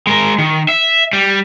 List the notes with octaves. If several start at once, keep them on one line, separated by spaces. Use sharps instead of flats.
G#3 A#4
D#3
E5
G3